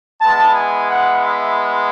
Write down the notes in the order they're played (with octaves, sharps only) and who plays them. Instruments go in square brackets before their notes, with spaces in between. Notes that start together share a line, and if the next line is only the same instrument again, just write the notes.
[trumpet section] G#3 B3 E4 A5
G#5
F#5
E5